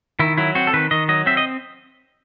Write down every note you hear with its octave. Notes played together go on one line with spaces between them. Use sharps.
D#3 E4
F#3 E4
C4 F#4
A4
D#3 B4
D#3 D#5
F#3 D#5
C4 E5
D#5